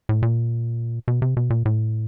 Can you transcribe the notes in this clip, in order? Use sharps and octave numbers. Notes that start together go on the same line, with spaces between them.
A2
A#2
B2
C3
B2
A#2
A2